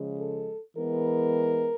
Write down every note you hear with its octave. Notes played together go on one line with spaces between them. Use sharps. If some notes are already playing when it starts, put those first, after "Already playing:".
Already playing: C#3 F3 G#3
A4
E3 G#3 B3 A#4